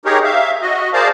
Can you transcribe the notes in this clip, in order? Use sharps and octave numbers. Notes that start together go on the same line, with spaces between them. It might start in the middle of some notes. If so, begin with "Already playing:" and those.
D#4 G4 G#4 A#4 C#5
E5 F5
F#4 D#5
G#4 A#4 C5 D5 F5 A5